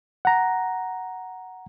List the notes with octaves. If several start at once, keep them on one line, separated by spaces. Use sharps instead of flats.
F#5 A#5